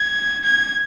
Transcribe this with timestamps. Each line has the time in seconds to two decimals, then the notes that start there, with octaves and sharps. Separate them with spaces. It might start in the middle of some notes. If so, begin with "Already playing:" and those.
Already playing: G#6
0.44 G#6